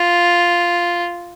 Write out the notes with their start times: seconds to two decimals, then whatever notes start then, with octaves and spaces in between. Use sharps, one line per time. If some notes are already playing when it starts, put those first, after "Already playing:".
Already playing: F4